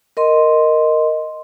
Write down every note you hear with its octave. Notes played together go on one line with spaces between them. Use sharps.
A#4 D#5 C6